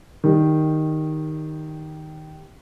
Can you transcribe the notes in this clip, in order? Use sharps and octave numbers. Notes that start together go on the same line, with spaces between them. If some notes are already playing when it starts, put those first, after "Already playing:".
D#3 G3